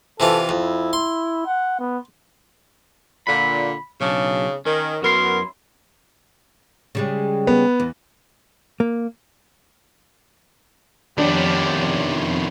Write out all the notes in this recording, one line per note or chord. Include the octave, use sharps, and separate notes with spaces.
C3 E3 F4 A4
F2 E4
C6
F#5
B3
A#2 D3 B5
B1 C#3 D4
D#3 C#4
F#2 B3 E4 F#4 A#4 C6
C#3 G3 G#3
B3
E2
A#3
F2 D#3 B3 D4 G4 C#5 D5 C6